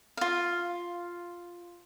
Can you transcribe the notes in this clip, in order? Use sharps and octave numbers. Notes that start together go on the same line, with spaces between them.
F4 F5